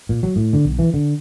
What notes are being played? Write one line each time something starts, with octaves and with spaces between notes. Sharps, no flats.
A#2
F#3
A2
D3
B1
E3
D3